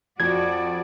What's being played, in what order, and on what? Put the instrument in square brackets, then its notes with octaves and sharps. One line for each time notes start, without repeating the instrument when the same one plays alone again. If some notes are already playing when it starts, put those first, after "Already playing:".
[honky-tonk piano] F2 [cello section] F#4 D5 [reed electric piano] G#6